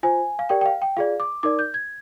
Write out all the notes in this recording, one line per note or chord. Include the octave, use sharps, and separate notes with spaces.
F4 C5 G#5
F5
G4 A#4 D5 G5
G5
F5
G5
F4 G#4 D5 F5
D6
D#4 A#4 D5 D6
G6
G#6